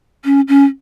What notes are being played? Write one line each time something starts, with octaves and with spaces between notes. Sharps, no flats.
C#4
C#4